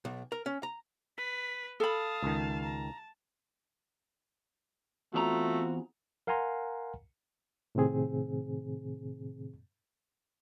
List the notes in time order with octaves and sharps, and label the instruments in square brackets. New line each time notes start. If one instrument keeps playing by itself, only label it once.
[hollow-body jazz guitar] B1
A#4
C#4
A#5
[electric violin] B4 [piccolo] B6
[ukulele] A4 B5 [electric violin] F5 A5 [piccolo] D#6
[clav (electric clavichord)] C#2 D#3
[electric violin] A5 [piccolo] A#5
[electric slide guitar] E2 D4 A#5 [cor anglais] A3 [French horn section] C4 F4 F#4
[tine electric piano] A#4 F5 F#5 G#5 A#5 C6
[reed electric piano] A2 C3 D#3 C4 G#4